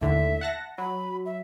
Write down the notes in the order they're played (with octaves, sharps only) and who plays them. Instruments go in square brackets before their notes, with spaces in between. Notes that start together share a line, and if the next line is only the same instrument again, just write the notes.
[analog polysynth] D#2 A2 D3 [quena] E5
[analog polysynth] F#5 A5 A#6
[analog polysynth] F#3 [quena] B5
[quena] E5